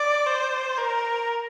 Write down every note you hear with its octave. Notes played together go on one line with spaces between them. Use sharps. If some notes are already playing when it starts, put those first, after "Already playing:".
Already playing: D5
C5
A#4